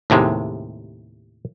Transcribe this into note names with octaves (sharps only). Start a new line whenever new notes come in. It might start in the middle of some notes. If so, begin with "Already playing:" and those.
D#2 A2 C3 G#3